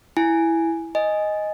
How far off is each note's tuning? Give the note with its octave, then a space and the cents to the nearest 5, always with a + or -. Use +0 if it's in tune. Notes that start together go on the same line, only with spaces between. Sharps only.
E4 +0 G#5 +0
D#5 +0 G#5 +0